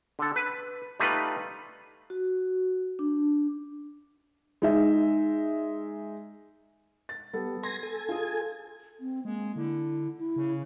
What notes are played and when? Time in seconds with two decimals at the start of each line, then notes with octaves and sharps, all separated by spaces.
0.19 D3 A4
0.36 B4
1.00 G3 A3 D#4 F4 B4
2.10 F#4
2.99 D4
4.62 G#3 D#4 E5
7.09 A6
7.33 G3 B3 A4
7.63 G#5 C6 A#6
7.83 A4 G#5
8.09 F4 G#4
9.00 C4
9.25 G#3 A#3
9.56 D3 E4
10.17 E4
10.36 C#3